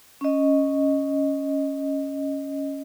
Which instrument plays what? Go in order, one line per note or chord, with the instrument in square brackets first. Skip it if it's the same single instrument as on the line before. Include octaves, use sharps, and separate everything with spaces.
[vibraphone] C#4 D#5